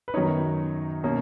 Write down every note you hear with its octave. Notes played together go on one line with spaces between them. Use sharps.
B4
F#2 D#3 F#3 B3 D#4 C#5
B2 A#3 C#4